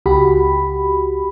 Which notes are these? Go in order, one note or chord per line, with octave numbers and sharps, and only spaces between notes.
C#2 F#4 G4 B5